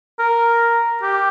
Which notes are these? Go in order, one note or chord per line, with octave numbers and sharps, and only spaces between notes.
A#4
G4